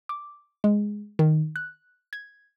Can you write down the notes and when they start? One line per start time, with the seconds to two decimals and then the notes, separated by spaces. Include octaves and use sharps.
0.09 D6
0.64 G#3
1.19 D#3
1.56 F#6
2.13 G#6